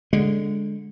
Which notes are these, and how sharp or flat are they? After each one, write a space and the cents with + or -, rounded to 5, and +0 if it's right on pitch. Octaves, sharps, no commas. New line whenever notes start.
D3 -5 G#3 -5